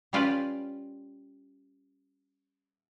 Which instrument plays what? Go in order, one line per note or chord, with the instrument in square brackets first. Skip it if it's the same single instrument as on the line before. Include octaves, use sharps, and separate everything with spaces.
[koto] G3 C#4 F4 G4 B4 D5